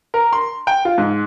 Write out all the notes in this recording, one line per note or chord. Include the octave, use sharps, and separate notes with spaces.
A#4
C6
G5
F4
G#2